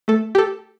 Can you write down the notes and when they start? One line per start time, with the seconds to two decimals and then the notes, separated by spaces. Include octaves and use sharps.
0.08 A3 A4
0.35 G4
0.38 A4